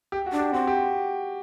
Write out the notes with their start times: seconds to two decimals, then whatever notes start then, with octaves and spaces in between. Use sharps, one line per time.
0.12 G4
0.26 F#4
0.32 D4
0.39 G4
0.53 C4 F#4
0.67 G4